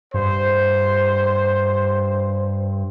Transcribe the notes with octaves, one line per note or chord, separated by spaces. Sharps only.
G2 C5